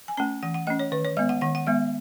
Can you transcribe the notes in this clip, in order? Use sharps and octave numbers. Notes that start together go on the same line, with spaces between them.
G#5
A3 C#4 A5
E3 F#5
F#5
A3 C#4 D#5
C#5
D#3 B4
C#5
G#3 B3 D#5
F#5
D#3 F#5
F#5
G#3 B3 E5